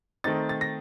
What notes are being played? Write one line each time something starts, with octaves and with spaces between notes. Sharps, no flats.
D#3 A3 C4 D#4 A6
A6
A#6